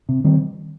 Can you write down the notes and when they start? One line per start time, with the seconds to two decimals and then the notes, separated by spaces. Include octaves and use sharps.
0.09 C3
0.24 D#3 G3 C4